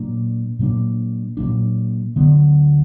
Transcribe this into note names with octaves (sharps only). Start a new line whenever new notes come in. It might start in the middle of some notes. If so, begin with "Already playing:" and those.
Already playing: A#2 F#3 A#3 D4
A#2 F#3 A#3 D4
A#2 F#3 A#3 D4
D2 D3 F#3 B3